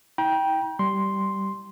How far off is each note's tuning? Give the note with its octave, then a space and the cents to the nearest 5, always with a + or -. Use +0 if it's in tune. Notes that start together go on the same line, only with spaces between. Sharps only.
E4 -45 G5 +0 A#5 +45
G3 -10 C6 +0